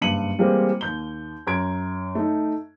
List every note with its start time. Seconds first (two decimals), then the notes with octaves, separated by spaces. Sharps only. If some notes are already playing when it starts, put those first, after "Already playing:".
0.01 F#1 G2 C#7 D#7 F#7
0.38 E3 G3 G#3 A#3 C4
0.81 D#2 G6 G7
1.47 F#2 A#5 C6 G#6 D7
2.15 A3 D#4